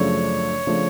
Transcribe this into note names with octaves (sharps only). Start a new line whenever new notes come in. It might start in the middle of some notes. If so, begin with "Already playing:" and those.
Already playing: F#2 C#3 F3 A3 D4 C#5
C#3 F3 A3 D4